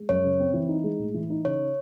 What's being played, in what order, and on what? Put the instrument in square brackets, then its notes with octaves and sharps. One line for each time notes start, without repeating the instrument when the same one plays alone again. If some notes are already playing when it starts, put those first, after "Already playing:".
Already playing: [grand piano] G#3
[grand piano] F#2 [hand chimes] C#5
[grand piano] C#3
C4
E3
D#4
G#3
A2
E3
D#4
[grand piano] C#3 [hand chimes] C#5